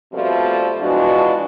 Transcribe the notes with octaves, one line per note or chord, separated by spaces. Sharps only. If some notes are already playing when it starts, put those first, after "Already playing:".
B2 F3 G3 A3 C4 A4
E2 B2 F3 G#3 D4 F#4